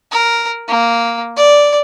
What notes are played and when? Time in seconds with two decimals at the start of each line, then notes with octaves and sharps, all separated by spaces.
0.11 A#4
0.68 A#3
1.36 D5